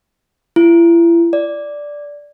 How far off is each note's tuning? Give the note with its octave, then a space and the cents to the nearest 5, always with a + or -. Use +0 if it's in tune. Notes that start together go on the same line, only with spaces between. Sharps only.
E4 +35
D5 -5